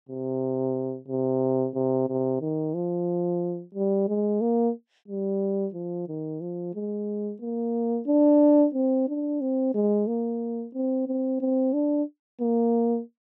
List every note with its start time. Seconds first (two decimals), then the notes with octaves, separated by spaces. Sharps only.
0.09 C3
1.08 C3
1.75 C3
2.08 C3
2.41 D#3
2.74 F3
3.74 G3
4.08 G#3
4.41 A#3
5.08 G3
5.74 F3
6.08 D#3
6.41 F3
6.74 G#3
7.41 A#3
8.07 D4
8.74 C4
9.08 D4
9.41 C4
9.74 G#3
10.07 A#3
10.74 C4
11.07 C4
11.40 C4
11.73 D4
12.41 A#3